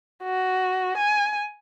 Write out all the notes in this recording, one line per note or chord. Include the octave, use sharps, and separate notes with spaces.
F#4
G#5